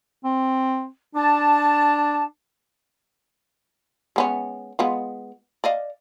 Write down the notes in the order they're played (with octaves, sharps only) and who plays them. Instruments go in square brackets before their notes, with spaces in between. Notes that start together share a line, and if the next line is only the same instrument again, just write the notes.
[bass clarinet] C4
[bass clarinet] D4 [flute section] A5
[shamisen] G#3 B3 C#4
G#3 B3 F4
D5 D#5 F5